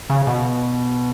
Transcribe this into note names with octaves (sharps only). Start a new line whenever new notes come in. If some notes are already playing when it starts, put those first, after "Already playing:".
C#3
B2